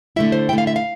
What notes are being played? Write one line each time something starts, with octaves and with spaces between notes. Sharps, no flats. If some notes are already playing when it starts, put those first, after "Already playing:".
D3 A3 E4 E5
C5
D3 A3 E4 G5
F5
E5
F5